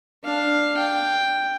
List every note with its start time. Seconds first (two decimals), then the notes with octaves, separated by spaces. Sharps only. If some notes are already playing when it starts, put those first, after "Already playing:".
0.24 D4 F5
0.77 G5